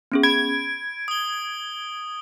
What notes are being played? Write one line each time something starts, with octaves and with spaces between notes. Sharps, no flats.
B3 C#4 G#4
B5 G#6 D7
D#6 G7